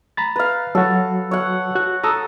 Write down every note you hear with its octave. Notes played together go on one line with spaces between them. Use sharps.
A#5 B5 A6
B4 F5
F#3 F#4 A4
C#5 F#5
F#4 F#6
A4 A#5 D#6 E6